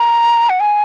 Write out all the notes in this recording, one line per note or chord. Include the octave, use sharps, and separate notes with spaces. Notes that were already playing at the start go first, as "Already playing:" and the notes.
Already playing: A#5
F#5
G#5